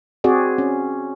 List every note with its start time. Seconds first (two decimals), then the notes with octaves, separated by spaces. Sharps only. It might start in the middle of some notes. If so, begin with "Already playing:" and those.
0.24 C4 F#4 G#4 D5
0.58 C#4